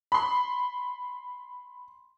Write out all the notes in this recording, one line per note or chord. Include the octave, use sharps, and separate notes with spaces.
B5 C6